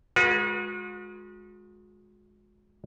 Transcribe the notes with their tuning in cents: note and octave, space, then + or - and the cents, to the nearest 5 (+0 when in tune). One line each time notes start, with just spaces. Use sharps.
G#3 +0 F#4 -40 B4 -45